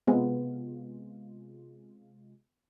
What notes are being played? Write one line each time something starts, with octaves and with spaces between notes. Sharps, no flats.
C3 G#3 B3 F4